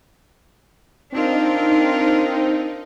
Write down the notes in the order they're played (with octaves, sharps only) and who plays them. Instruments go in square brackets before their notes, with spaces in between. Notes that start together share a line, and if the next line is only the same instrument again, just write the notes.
[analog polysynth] C4 [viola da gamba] D4 F4 A#4 [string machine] D#4